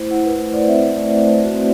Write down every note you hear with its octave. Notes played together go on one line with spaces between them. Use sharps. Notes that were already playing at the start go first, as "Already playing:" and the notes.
Already playing: A3 E4 C5
E4 F#5
B4
A3 C5
D5
C4 E5
A3 D5
A3 C5
F#4
C4